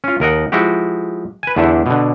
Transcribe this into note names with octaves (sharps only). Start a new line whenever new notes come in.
C#4 F4
D#2 A#4 D#5 F#5
F3 G#3 E4 F#4 G4
B4 G#5
E2 D3 D4 G4 E5
B2 D3